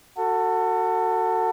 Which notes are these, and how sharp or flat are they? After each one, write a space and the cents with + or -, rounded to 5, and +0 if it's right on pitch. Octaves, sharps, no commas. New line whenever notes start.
F#4 -5 A4 +25